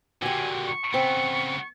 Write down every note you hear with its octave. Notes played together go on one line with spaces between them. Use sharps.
A#2 D3 F#4 G4 G#5
C#6
C#3 B3 C4